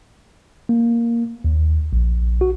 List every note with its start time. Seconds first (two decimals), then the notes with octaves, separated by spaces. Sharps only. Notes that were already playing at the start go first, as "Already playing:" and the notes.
0.69 A#3
1.44 D#2
1.93 A#1
2.41 F#4